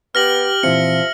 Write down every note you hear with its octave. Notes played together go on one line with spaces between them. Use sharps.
B3 G4 F6 A#6 F#7
A#2 E3 F3 C4 E5 C#7